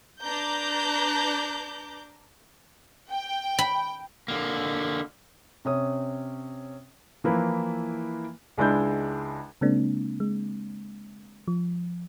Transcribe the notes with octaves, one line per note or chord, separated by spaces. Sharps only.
D4 B4 A#5 D6 G6
G5
B5
D3 A#3
C3 C#4 D#6
E3 F3 A#3 E4 B4
C#2 G#3 D4 E4 G6
C#3 G#3 A#3 C4 D4
G#3
F3